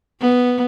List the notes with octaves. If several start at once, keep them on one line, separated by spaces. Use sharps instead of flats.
B3